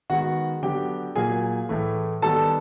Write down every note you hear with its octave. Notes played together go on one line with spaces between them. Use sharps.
D#3 G#3 B3 F#4 F#5
D3 F#3 B3 G4 G5
A#2 F#3 A#3 G#4 G#5
A2 E3 A3
D#3 G3 B3 A4 A5